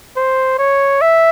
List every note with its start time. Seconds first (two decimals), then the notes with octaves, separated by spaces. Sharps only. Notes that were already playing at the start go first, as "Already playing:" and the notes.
0.17 C5
0.59 C#5
1.01 E5